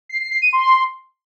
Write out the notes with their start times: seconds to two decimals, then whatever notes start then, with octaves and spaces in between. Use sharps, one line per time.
0.09 C7
0.20 C7
0.31 C7
0.42 D#7
0.53 C6